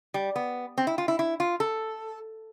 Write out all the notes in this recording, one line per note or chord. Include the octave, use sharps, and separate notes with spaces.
G3
B3
C4
E4
F4
E4
E4
F4
A4